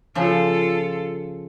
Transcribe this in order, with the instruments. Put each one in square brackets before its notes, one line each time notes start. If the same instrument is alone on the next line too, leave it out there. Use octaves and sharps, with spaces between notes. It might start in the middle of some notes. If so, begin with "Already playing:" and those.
[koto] C#3 F3 [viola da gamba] F4 A4